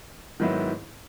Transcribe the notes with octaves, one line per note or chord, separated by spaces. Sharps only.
G#2 D#3 F#3 B3 E4